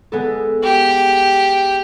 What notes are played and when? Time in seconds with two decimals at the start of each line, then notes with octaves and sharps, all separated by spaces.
0.12 G#3 B3 A4
0.63 G4